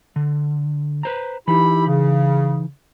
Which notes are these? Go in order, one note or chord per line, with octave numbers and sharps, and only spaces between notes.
D3
B4 C5 A#5
E3 D#4 E4 G4 B5
C#3